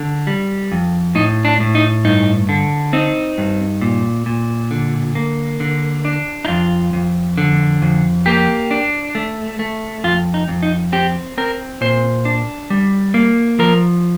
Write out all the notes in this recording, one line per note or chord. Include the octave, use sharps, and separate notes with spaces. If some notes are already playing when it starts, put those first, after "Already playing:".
Already playing: D3
G3
F2
A2 D#4
D4
A2
D#4
G2 D#4
D3
C4 D#4
G2
A#2
A#2
D3
A#3
D3
D4
D#4
F2 F4
F2
D3
F2
A#3 G4
D4
A3
A3
F2 F4
D#4
F2
D#4
C4 G4
C4 A#4
A#2 C5
D4
G3
A#3
F3 A#4